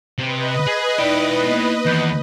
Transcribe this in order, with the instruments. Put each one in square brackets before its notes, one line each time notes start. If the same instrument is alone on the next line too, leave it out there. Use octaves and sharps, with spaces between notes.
[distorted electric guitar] C3 [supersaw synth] B4 D#5
[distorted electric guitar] G#4
[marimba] D#4 D5 [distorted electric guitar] E4 G5
[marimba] A#3 B3
[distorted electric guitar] E2 [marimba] D#3 G6